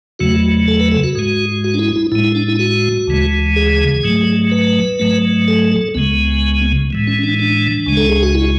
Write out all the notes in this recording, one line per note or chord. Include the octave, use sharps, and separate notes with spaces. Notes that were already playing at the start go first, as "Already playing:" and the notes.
E2 C#3 F#3 A3 F#4
A4
B4
A4
F#4
G#2 G#3
F#4
D4
E4
E4
A2 G#3 E4
E4
D4
E4
F#4
D2 C#3 E3 G#3
G#4
G#2 F#3 A3
B4
G#2 F#3 A3
A4
A4
C#2 C#3 G#3 B3
A2 E3 G#3
C#4
D4
D4
C#2 C#3 G#3
A4
G#4
F#4
E4